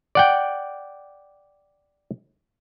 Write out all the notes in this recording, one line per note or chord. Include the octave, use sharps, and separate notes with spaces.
D5 F#5 G5